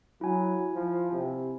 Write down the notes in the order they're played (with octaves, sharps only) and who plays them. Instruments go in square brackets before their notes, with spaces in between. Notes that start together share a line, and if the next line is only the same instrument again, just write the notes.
[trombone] F#3 [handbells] E4 G#5
[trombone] F3
C3